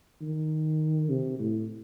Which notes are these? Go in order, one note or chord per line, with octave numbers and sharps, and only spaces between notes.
D#3
C3
A2